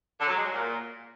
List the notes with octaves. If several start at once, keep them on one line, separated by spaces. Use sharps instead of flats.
D3
F#3
G#3
F#3
A#2